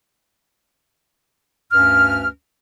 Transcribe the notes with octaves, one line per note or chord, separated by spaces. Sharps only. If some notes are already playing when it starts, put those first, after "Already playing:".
D2 G2 C#4 B4 F6